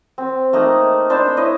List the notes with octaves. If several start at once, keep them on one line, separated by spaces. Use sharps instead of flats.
C4
A3 A#3 D#4
D4 C5 A5 B5
E4 C#5 D#5